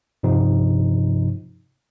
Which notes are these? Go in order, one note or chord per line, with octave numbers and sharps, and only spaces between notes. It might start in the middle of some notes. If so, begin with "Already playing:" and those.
G2 C3 F3 D#4